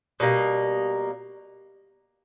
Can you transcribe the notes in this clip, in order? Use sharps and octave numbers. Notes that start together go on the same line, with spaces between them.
B2 G3 A#3